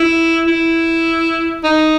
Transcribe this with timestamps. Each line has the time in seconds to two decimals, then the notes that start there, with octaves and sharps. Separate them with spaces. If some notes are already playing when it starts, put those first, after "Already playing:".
Already playing: E4
0.48 E4
1.64 D#4